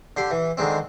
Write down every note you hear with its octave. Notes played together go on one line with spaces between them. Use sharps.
D3 G4 C6
E3
D3 D#3 G#3 C4